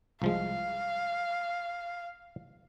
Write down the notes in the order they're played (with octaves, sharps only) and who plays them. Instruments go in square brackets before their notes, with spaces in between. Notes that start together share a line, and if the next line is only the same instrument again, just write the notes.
[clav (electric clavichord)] C2 F3 G#3 [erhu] F5